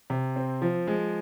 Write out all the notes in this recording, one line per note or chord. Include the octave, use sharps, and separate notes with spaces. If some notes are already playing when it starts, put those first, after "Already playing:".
C3
C4
F3
G#3